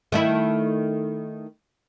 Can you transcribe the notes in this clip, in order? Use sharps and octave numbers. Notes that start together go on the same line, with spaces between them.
D#3 A3 E4